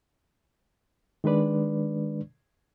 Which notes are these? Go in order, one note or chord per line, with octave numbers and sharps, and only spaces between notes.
D#3 G#3 D4 B4 D5